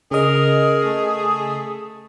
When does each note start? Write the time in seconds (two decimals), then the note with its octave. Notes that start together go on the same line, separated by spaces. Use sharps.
0.11 C#3 G#4 A#4 D#5
0.83 A3